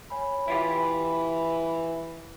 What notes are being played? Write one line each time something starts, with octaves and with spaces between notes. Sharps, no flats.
C#5 G#5 B5
E3 E4 F4 G4 B5